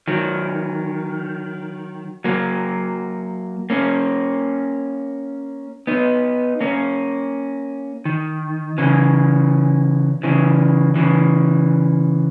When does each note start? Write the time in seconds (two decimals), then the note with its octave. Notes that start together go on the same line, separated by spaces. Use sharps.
0.07 D#3 F#3
2.24 F#3 A#3
3.70 A#3 C#4
5.87 B3 D#4
6.61 A#3 C#4
8.05 D#3
8.78 C#3 E3
10.23 C#3 E3
10.96 C#3 E3